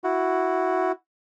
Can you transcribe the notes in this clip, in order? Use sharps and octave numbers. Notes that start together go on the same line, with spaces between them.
E4 F#4